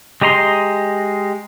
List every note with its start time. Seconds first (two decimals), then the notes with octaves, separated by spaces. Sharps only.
0.22 G#3 G4 D#5 A#5 C6